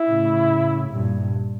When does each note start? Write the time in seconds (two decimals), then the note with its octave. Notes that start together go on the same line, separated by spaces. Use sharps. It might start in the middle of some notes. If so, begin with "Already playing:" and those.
Already playing: E4
0.08 A2 C#3
0.91 G2 A#2